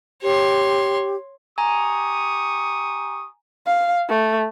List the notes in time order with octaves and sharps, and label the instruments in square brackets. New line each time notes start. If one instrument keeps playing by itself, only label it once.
[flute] G4 [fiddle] C#5 C6
[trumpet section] G4 C#6 D#6 [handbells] G#5 A#5
[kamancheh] F5
A3